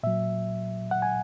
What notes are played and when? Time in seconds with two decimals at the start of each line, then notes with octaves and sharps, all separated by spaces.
0.03 A#2 F#3 E5
0.91 F#5
1.02 G#5